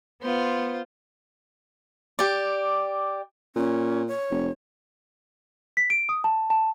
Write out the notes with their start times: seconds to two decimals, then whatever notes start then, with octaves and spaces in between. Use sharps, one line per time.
0.22 B3 F4 C5
2.19 G4 D5
3.56 A#2 C#4
4.08 C#5
4.31 F1
5.77 B6
5.90 D7
6.09 D#6
6.24 A5
6.50 A5